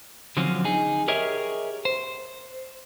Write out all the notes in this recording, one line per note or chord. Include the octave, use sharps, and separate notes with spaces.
D3 F3 F#3 C4 C#4
D#4 G#4
G4 G#4 A#4 C#5 D#5 E5
C5